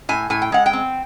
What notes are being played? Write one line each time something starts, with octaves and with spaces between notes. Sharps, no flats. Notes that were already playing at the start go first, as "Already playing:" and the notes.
A2 G#5
A2 G#5
G5
G#3 F#5
G5
C4